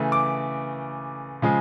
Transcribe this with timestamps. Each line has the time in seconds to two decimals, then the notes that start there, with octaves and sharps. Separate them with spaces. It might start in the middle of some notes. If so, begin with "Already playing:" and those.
Already playing: C#3 E3 A3
0.12 D6
1.42 C#3 F3 G#3